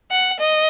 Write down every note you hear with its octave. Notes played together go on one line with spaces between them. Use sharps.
F#5
D#5